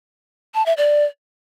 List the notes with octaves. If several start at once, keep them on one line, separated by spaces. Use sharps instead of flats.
A5
E5
D5